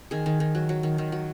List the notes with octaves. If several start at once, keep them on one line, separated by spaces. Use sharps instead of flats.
D#3 G#4
D#3
D#3
F#3
F#3
D#3
D#3
F#3